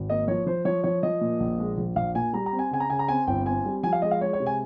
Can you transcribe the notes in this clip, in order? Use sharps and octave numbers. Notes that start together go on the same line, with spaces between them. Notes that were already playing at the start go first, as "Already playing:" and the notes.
Already playing: G#1
A#3 D#5
F3 C#5
F3 C5
F3 C#5
F3 C#5
F3 D#5
A#2
A#1
G#3
A#1
A#1 F5
A#2 G#5
G3 A#5
A#5
C4
G#5
C#3 G#5
A#5
C#3 G#5
A#5
C4 G#5
G1 G5
C4 G#5
G3
F3 G#5
F5
G#3 D#5
F5
G#3 C#5
C#5
C3
G#5